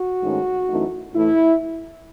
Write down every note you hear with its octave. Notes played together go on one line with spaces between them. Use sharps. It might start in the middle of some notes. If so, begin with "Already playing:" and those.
Already playing: F#4
G#2 D#3 A3 C#4
F#2 E3 A3 D#4
A2 E3 A3 E4